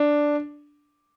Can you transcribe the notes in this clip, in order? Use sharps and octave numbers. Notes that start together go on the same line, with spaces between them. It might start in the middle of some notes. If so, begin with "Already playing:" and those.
Already playing: D4